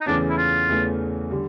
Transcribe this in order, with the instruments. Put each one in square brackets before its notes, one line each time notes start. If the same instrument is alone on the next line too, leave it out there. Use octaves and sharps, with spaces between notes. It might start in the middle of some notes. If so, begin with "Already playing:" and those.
[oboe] D#4
[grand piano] E2 C#3 E3 A3 C#4 [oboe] D4
[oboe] E4
F4
[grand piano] E2 C#3 E3 A3 C#4
D3 G3